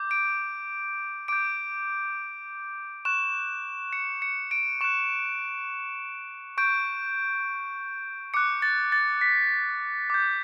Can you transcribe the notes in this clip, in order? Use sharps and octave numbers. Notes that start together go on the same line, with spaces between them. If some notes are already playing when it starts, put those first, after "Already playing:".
Already playing: D6 G6
D7
D6 G6 D7
C#6 F#6 E7
C#7
C#7
D7
C#6 F#6 E7
C#6 G6 D7
D6 F#6 C#7
A6
A6
B6
D6 G6